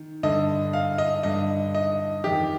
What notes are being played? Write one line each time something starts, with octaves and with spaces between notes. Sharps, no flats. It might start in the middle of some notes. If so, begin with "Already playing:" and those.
Already playing: D#3
G2 D3 D#5
F5
D#5
G2 D3 D#5
D#5
F2 D#3 G4